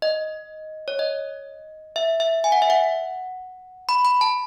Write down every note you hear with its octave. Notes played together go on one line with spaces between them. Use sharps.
D#5
C#5
D#5
E5
E5
G#5
F#5
E5
F#5
B5
B5
A5